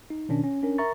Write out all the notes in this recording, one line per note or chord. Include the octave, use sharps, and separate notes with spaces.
D#4
B2 D#3 C#4 D4
C#4
C#4 D4 A#4
A#4 E5 A#5 C#6 A6